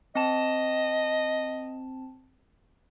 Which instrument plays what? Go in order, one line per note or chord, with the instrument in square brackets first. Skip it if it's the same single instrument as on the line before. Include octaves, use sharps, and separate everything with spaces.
[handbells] C4 A5 [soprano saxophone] D#5